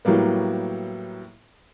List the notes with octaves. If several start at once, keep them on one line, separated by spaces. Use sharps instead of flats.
A2 F#3 G3 A#3 B3